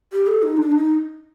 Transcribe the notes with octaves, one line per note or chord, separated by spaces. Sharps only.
G4
A4
D#4
D4
D#4